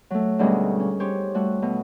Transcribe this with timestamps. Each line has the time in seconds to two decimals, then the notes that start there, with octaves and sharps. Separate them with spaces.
0.10 F#3 A3
0.39 D2 G#2 B2 G3 C#4 D#5
0.80 C#4
1.00 G4 C5 C#5
1.34 G3 A3 F#4
1.62 B2 A3